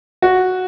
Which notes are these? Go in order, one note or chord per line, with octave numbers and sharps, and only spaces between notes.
F#4